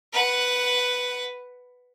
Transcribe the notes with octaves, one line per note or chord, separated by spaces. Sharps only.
B4 F#5